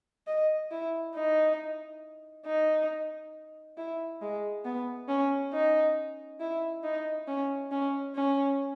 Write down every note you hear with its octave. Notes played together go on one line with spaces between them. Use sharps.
D#5
E4
D#4
D#4
E4
G#3
B3
C#4
D#4
E4
D#4
C#4
C#4
C#4